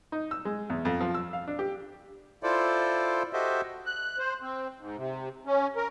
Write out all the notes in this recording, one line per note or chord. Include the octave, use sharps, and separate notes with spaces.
D#4
E6
G#3
E2
F2
F3
E6
F5
D4
G4
E4 F4 A4 C5 D5
F#4 G4 A4 C5 D#5 E5
F#6
C5
C4
G#2
C3
C#4
A#4